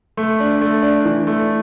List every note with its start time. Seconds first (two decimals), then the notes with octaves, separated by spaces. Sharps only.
0.17 A3
0.40 D4
0.61 A3
0.83 D4
1.05 E3
1.27 A3